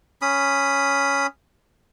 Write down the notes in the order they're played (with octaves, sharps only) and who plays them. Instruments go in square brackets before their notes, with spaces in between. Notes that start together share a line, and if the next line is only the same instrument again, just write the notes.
[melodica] C#4 B5 D#6